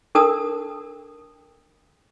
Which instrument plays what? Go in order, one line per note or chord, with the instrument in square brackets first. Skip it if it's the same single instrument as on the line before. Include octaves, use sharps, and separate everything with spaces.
[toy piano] D4 A4 A#4 A5 D#6 E6